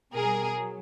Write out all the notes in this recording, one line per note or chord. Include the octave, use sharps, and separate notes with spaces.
B2 G3 G#4 A#4
F#3